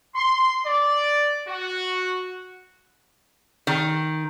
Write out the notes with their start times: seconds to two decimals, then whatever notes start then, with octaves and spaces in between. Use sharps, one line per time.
0.14 C6
0.65 D5
1.47 F#4
3.67 D#3